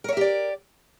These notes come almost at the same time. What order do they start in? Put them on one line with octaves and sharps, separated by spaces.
A#4 C#5 E5 G4 D5